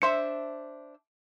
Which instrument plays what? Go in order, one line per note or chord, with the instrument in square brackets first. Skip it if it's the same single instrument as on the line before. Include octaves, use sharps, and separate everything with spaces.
[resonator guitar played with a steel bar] D4 C5 E5 [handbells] C6 C#7